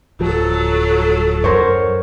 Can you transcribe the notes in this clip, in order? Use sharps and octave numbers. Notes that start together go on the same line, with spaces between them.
D1 F3 F#3 A4
F#2 A#4 C5 C#5